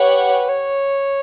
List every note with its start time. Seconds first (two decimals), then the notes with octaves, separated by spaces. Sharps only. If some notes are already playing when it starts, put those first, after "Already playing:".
Already playing: G4 B4 C#5 F#5
0.49 C#5